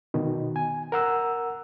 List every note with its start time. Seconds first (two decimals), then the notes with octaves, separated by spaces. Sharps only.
0.14 B2 D#3
0.56 G#5
0.92 A#4 F#5 E6